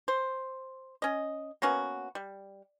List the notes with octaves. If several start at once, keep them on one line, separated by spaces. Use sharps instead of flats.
C5
C#4 D#5
A#3 B3 C#4 F#4
G3